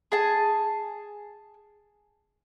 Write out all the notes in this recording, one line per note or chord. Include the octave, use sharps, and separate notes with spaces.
G#4 A5